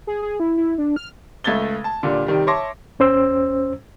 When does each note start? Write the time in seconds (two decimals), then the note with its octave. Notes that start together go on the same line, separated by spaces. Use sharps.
0.07 G#4
0.22 G#4
0.40 E4
0.57 E4
0.78 D4
0.96 F6
1.44 C#2 A3 G#6 A6 G7
1.84 A5
2.03 A#2 D3 G3
2.26 C3 D#3 G3
2.47 C#5 E5 A5 C6 D6 A#6
2.99 E2 C#4 C5 E6